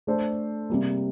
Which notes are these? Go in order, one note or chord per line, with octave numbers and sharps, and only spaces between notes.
A3 D4 A4 C5
C3 G3 A#3